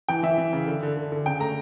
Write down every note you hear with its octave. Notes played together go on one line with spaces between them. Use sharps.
E3 G5
E3 E5
E3
C#3
D3
D3
D3
D3
C#3 G5
A3 A#5